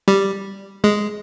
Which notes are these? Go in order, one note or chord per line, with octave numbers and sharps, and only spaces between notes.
G3
G#3